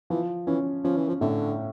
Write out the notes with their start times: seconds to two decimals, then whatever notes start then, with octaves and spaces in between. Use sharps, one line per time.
0.10 E3 F3
0.47 E3 C#4
0.84 F3 C#4
0.96 E3
1.08 F3
1.21 A2 D3